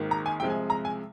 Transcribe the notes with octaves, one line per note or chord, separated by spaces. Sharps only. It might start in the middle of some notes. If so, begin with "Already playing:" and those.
Already playing: G#1 G#2 D#3 A#3
A#5
G#5
C2 C3 F3 G#3 G5
G#5
A#5
G#5